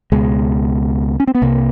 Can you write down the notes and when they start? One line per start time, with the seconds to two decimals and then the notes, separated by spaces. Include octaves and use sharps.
0.12 C#2 B2 G#3
1.20 C#4
1.27 C4
1.35 B3
1.42 C2 C3 A#3